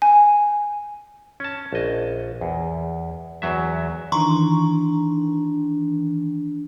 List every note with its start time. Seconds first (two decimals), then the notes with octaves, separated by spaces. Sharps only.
0.02 G#5
1.40 C#4 A5
1.73 A#1 D#5
2.41 E2
3.42 E2 F#3 E5
4.12 D#3 E3 D4 A#5 C6 C#6